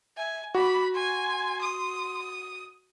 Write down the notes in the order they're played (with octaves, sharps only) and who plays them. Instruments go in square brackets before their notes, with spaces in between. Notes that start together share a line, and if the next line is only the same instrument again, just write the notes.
[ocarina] E5 [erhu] G#5
[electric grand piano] F#4 [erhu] B5 [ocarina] D6
[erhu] G#5 [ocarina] C6
[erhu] D#6